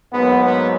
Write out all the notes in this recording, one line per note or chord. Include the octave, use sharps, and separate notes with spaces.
G#2 F#3 A#3 B3
B3